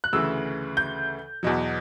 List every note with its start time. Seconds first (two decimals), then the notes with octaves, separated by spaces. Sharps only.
0.04 F#6
0.13 D2 C#3 E3 E6
0.77 G6
1.43 E2 B2 F#3